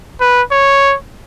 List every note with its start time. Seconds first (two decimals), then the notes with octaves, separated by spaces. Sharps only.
0.20 B4
0.51 C#5